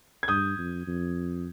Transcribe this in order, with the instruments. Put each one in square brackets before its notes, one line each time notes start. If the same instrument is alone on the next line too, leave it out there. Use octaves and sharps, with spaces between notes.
[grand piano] G#6
[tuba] G2 [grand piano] D#6 G6
[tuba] F2
F2